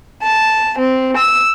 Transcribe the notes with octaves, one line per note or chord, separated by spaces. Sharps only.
A5
C4
E6